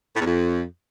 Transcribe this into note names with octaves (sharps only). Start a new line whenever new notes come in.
A2
E2
F2